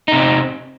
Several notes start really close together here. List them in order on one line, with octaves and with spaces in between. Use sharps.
D#4 C3 C4